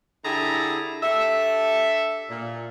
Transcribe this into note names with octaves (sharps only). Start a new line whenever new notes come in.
D3 E4 G4 G#4 A5 A#5
D4 G4 A4 E5
A#2